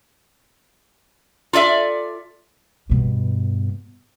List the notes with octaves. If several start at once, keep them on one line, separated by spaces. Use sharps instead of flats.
F4 A4 D5 E5
G2 B2